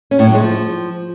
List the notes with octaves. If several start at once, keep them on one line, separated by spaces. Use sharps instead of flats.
C#4
A2
F#3
G#3
F3